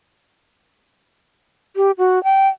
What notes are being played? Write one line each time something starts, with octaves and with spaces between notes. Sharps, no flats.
G4
F#4
G5